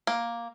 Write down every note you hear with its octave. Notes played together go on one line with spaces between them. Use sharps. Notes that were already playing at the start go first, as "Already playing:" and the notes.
A#3